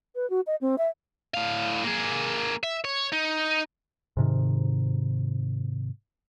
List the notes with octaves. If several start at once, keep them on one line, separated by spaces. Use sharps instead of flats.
B4
F#4
D#5
C4
E5
A2 F5
A#3 G#4
E5
C#5
D#4
G#2 C3 D#3